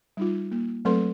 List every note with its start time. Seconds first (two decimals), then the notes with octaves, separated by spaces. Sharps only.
0.17 G3 D#4 F4
0.51 A#3
0.85 F#3 A3 C4 A4 B4 C6